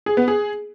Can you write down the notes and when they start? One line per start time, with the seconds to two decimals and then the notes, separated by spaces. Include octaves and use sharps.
0.06 G#4
0.17 B3
0.28 G#4